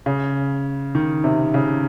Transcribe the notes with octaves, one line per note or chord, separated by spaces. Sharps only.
C#3
D#3
C3
C#3